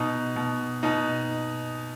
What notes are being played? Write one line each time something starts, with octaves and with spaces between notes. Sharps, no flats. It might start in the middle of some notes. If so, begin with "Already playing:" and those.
Already playing: B2 D#4
B2
B2 D#4